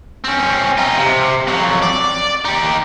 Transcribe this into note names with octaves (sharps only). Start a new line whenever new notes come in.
C4 C#4
D#4 F4
C3
F2 F#3
D5
D#4 G4